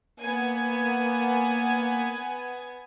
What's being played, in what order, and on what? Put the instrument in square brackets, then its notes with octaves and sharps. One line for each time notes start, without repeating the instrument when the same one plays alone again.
[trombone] A#3 [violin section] B3 G#5